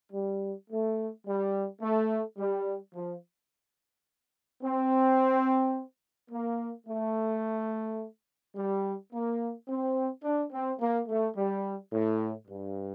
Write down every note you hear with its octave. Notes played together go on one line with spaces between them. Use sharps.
G3
A3
G3
A3
G3
F3
C4
A#3
A3
G3
A#3
C4
D4
C4
A#3
A3
G3
A2
G2